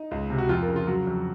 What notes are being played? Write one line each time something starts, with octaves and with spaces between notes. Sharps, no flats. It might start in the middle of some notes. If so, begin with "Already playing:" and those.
Already playing: D#4
C#2
C3
F#4
F2 F4
A#4
C#3
F4
F#3 F#4
F2